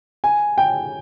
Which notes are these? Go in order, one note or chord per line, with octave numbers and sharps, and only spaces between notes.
G#5
G5